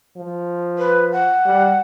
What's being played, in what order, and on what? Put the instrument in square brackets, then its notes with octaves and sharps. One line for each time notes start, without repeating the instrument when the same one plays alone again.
[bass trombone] F3
[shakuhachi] B4
F#5
[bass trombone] G3